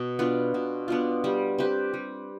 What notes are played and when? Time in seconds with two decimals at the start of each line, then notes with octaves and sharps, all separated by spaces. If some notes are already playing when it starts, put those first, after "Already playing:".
Already playing: B2
0.19 B3 D4 F4
0.54 B2
0.88 B3 D4 F4
1.24 G3
1.58 C4 G4 B4
1.94 G3